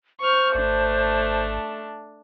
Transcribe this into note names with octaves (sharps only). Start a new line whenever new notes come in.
C5 C#6 F6
G#1 A3 D4